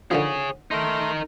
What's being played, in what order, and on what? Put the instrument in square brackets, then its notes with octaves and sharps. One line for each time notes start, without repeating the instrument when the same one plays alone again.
[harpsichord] D3 D#3 F3 [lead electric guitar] G#4 C#5
[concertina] A3 C6 [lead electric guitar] D#4 A#4